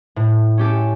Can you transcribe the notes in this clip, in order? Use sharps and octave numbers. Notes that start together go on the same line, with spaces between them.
A2
C#4 G4 A4